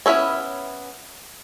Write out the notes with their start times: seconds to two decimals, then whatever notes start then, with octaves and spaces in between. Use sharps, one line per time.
0.06 B3 C#4 E4 A4 C#5